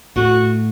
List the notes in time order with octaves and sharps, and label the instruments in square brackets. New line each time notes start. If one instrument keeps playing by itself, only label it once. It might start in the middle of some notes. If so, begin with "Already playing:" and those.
[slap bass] A2 A3 [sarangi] F#4